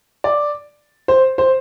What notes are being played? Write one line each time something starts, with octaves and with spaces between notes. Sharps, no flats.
D5
C5
C5